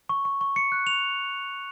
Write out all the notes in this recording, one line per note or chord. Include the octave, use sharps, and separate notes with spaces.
C#6
C#6
C#6
C#7
F#6
F7